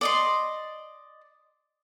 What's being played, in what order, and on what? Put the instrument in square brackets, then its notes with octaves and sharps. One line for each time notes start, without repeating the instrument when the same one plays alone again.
[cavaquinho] D5 D#5 C6